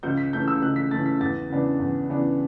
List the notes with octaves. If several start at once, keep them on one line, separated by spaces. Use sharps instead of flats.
C#2 G6
B6
C#3 E3 A3 G6
E6
C#2 F#6
B6
C#3 E3 A3 A6
B6
E2 A6
C#3 E3 B3 D4
E2
C#3 E3 B3 D4